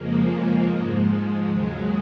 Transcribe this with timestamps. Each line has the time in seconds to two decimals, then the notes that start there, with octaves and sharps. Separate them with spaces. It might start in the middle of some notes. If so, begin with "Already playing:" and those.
Already playing: F2 C#3 F3 G#3 A#3
0.67 G#2 F3 G#3
1.46 D#2 C#3 F#3 G#3